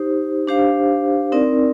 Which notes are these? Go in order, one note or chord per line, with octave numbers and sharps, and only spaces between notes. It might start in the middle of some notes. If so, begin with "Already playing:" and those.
Already playing: D#4 G4 C5
D4 G4 C5 F5
C4 D#4 A#4 D5